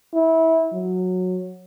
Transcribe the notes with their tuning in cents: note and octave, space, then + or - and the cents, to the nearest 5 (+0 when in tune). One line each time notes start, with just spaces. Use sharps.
E4 -25
F#3 -15